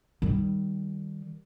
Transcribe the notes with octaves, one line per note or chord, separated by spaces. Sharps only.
D#3 G3